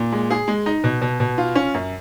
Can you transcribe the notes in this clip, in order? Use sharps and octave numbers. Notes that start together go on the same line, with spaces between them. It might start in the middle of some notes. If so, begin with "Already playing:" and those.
Already playing: A#2
G#3
G#4
G#3
D#4
B2
B2
B2
F4
C#4
F#2